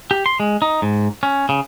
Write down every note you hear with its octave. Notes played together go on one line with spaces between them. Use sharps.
G4
C6
G#3
D#4
G#2
C#4
C#3